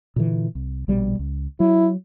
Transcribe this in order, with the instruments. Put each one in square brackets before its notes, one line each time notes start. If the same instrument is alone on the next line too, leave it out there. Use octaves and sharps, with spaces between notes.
[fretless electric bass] A#2 D3 E3
C2
A#1 B2 G3
C#2
[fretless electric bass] F#3 [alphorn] E4